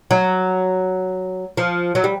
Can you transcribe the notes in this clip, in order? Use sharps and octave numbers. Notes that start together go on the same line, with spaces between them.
F#3
F3
F#3
G3